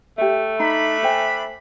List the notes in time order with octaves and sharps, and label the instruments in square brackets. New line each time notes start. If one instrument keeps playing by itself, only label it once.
[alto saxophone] A3 [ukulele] G4 C#5 E5
[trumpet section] D4 B5 [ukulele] D#4 A#5
[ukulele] C5 G5 G#5